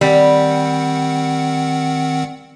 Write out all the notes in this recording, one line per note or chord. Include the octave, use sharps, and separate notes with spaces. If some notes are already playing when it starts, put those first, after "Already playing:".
D#3 G3 C4 F#5